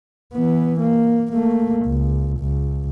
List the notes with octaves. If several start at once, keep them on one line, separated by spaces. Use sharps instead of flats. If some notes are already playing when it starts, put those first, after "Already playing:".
E3 B3
A#3
A3 A#3
C#2
C#2